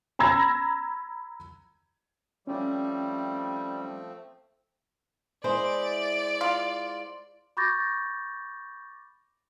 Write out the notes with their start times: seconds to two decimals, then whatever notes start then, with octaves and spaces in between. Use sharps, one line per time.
0.19 A#5 B5 E6 G#6 A#6
2.47 F3 G3 A3 C4 C#4
5.44 G#3 E4 C5 D5
6.41 F4
7.57 B5 C#6 D6 G6 A6 A#6